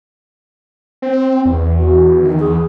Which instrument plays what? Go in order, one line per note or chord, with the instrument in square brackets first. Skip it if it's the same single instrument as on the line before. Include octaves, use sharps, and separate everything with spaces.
[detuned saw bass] C4
E2
[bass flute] F#4
D#3
G#4